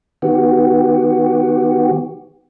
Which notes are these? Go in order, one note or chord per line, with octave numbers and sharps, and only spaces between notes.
D#3 B3 F#4 G4